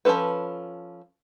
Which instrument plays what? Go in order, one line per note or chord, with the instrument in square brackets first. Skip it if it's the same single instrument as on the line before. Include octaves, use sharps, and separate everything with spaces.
[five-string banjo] F3 G#3 C#4 A4 B4